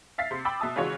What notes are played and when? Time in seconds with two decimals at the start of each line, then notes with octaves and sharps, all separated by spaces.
0.18 E5 F5 A6 B6 C7
0.31 C3 C6
0.45 G5 B5 D6 E6 A6
0.60 B2 E5 A5 D#6
0.76 C#3 E3 G#3 F4 F#4 C#5